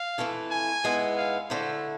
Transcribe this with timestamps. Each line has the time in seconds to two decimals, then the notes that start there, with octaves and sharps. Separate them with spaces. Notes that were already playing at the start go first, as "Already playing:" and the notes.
Already playing: F5
0.18 F2 E3 A3 E4
0.51 G#5
0.84 G#2 G#3 B3 E4
1.17 F5
1.50 D3 A3 E4 C5